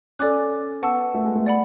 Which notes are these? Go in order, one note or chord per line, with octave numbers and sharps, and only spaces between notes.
C#4 A4 D5 G#5 D6 F#6
B3 F#5 A5 C#6 E6
A3
G#3
A3
D5 F#5 B5